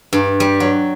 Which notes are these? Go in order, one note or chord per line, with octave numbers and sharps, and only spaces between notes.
G2
G3
F#3